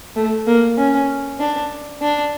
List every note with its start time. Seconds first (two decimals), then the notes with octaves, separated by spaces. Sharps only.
0.16 A3
0.47 A#3
0.78 C#4
1.40 D4
2.02 D4